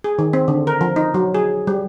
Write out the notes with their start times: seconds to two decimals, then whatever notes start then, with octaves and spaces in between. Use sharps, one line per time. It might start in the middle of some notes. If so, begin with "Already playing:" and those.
0.04 G#4
0.19 D#3
0.33 C4
0.48 D3
0.67 A#4
0.81 F3
0.96 D#4
1.14 F#3
1.35 G#4
1.67 G3